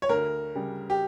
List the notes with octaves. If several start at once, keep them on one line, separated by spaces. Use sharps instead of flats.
C#5
D2 A#4
C#3 G3
G4